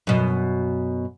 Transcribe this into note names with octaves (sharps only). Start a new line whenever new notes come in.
F#2 B2